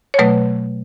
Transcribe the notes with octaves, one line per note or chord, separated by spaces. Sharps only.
C#5
B2 F#3 A3 B4